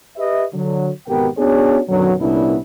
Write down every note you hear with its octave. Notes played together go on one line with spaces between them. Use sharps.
G4 B4 D#5 E5
D3 F#3
G#1 B2 B3 G4 A#4 G5
B3 C#4 D4 F#4 G#4 C#5
F#2 B2 D3 D#3 F#3
C2 A#2 B3 C#4 D4 E4